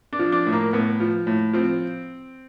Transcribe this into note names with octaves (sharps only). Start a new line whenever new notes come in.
D4
F3
D4
A2
A#3
A2 B3
F3
A2
F3 C4